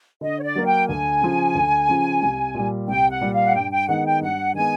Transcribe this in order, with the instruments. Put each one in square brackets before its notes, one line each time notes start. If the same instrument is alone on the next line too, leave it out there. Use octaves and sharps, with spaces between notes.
[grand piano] D3 [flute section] D#5
[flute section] C#5
D5
[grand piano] F#3 A#3
[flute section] G5
[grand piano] D2 [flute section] G#5
[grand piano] C#3 F3
D2
C#3 F3
C2
A#2 G3
[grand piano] C2 [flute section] G5
[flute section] F#5
[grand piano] A#2 G3
[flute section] F5
F#5
[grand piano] G2 [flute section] G5
[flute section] G5
[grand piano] D#3 G#3 B3 [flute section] F#5
[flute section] G5
[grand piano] G2 [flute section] F#5
[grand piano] D#3 G#3 B3 [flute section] G#5